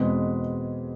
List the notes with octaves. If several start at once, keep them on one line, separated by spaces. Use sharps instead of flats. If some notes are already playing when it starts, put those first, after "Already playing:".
Already playing: E2 B2 G#3 C4 B4